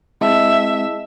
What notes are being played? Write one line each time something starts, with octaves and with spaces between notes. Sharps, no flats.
G#3 C4 E4 G#4 D#5 E5 A5